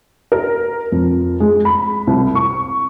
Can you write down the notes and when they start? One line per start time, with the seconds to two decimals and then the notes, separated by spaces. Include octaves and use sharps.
0.32 A#4
0.92 F2
1.40 G#3
1.65 B5
2.07 C2
2.35 C#6